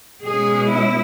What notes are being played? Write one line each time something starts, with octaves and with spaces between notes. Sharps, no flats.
B2 G#3 C#4 G#4
E4